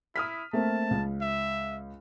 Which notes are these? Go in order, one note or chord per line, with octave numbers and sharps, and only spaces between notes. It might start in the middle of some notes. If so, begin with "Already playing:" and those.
E4 D#6 F6 B6
A3 A#3 C4 A5
C#2
E5